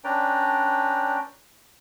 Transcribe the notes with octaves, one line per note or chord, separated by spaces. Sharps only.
C#4 D4 B4 D5 G5 A#5